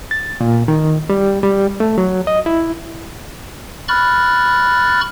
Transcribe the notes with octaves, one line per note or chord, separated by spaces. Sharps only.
A6
A#2
D#3
G3
G3
A3
F#3
D#5
E4
B5 C#6 F6 F#6 A6